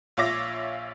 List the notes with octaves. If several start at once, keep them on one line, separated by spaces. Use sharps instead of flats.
A#1 F4 C#5 E5 D6 A#6